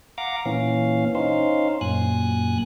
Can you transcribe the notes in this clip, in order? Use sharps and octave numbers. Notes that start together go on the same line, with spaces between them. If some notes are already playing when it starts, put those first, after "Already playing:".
F5 F#5 A#5 D6
A#2 E3 C#4 F5
C#4 D#4 C5 F5
F#2 A#2 G#5 F#6